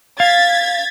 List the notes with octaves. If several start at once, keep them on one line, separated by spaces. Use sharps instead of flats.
F5 G#6 A6 B6